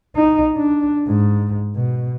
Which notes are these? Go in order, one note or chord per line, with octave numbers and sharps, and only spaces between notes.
D#4
D4
G#2
B2